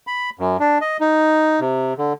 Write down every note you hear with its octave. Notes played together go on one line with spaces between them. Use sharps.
B5
F#2
D4
D#5
D#4
C3
D3